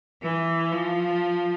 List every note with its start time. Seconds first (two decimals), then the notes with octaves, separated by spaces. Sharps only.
0.22 E3
0.72 F3